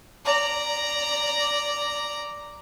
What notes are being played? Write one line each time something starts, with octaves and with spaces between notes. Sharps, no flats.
D5 A#5